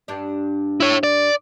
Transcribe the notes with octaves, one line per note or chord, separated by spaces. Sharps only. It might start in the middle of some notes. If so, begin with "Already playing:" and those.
G2 D4
E4 C#5
D5